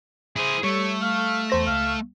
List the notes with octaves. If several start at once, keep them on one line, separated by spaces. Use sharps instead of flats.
E4 G#4 C5
G3 A3 C#5
F5
E2 C5 A#6
C#2 F5